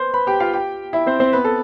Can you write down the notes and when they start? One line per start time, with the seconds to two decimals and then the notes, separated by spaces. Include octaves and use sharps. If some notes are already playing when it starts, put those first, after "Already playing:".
Already playing: B4 C5 C6
0.14 B4 B5
0.27 G4 G5
0.40 F4 F5
0.53 G4 G5
0.93 E4 E5
1.07 C4 C5
1.20 C4 C5
1.33 B3 B4
1.44 A4